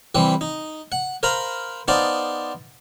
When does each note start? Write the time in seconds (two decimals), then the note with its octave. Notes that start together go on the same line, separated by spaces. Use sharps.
0.15 E3 G3 C4 B4
0.41 D#4
0.92 F#5
1.23 A#4 C5 F5 A#5 B5
1.88 B3 D#4 C5 D5 F5 A5